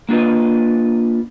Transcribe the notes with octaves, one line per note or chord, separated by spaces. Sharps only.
A#3 D4 F4 B4 D#5